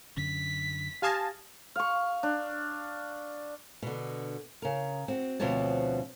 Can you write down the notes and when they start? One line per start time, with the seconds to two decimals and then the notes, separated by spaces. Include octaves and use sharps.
0.17 F#2 D3 C#4 B6
1.02 G4 F5 G#5 A5 D#6 A#6
1.76 F5 C#6
2.23 D4
3.82 B2 D3
4.62 C#3 A#4
5.08 C4 F#4
5.40 D2 B2 F3 C4 C#5 A5